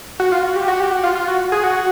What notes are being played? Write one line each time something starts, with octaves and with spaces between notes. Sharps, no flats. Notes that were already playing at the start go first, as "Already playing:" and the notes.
F#4
F4
F#4
G4
F#4
G4
F#4
F4
F4
F#4
G#4
F#4